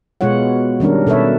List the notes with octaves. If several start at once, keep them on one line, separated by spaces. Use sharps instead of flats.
B2 G#3 B3 F4 C#5 F#5
D#3 G3 C#4 D4 A#4
B2 A4 B4 C#5 E5